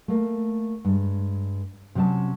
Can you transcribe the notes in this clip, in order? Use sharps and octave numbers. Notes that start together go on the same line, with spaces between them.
A3 A#3
G2 G#3
C3 F#3 C#4 G5 A5